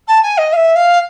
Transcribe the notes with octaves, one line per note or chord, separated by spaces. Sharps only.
A5
G#5
D#5
F5
E5
F5